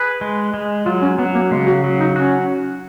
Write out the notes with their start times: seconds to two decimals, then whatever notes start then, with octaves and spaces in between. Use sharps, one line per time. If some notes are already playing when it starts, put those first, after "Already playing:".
Already playing: G#4 B4
0.21 G#3
0.54 G#3
0.86 F#3 F4
1.02 C#4
1.19 F#3 B3
1.35 A#3
1.51 C#3 G#3
1.67 F#4
1.84 F#3
2.00 D#4
2.16 C#4 F#4